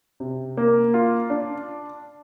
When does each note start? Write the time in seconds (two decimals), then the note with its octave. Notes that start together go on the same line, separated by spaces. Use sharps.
0.20 C3
0.57 A#3
0.94 F4
1.30 D4